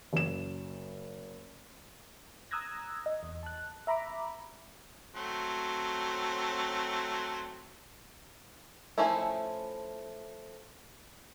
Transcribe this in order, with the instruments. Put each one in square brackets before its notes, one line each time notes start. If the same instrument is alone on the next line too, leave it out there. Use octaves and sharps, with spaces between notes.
[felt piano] F#1 E7
[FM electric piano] A#5 D#6 E6 F#6 G#6 A#6
D#5
E2
A5 F#6
E5 A#5 B5 D6
[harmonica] F#3 A3 C4
[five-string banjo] F3 A3 C#4 D#4 E4